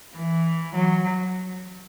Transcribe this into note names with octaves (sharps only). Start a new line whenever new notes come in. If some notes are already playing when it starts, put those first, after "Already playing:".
E3
F#3